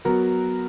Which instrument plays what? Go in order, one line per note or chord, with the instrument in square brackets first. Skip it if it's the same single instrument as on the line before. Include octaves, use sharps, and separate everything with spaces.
[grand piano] F#3 B3 F#4 A#4